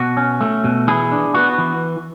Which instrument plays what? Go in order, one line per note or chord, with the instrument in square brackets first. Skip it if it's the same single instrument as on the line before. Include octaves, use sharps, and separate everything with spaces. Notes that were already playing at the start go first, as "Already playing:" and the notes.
Already playing: [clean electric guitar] B2 F#4
C#4
A3
B2
E3 E4 G#4
D4
B3 F#4
E3